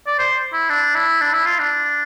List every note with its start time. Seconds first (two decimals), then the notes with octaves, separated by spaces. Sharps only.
0.07 D5
0.19 C5
0.53 E4
0.70 D4
0.95 E4
1.21 D4
1.33 E4
1.46 F4
1.59 D4